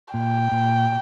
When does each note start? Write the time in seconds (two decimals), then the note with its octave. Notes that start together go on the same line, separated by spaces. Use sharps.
0.14 A#2 G5
0.52 A#2